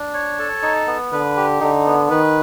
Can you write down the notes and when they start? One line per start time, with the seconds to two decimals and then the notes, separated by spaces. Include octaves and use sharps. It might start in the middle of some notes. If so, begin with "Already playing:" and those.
Already playing: D4
0.14 C#5
0.39 A4
0.62 D#4
0.87 B3
1.12 D3 B4
1.37 G4
1.61 D3 D#4
1.86 B3
2.10 D#3 B4